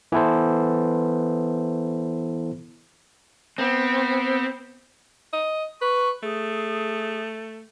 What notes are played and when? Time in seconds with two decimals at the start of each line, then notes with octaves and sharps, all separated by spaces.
0.12 E3 B3 E4 A4 C5
3.58 B3 C4
5.33 D#5
5.81 B4 C#6
6.23 A3 G#4